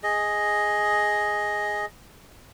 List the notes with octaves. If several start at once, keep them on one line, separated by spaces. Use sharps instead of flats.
G#4 D#5